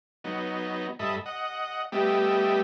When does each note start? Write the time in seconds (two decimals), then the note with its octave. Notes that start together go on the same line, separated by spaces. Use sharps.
0.24 F#3 B3 D#4
0.99 G2 A4 D#5 E5 B5
1.26 D#5 F#5
1.92 G3 A3 B3 G4 D#5 E5